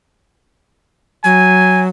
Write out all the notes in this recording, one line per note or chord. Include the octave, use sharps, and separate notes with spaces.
F#3 G#5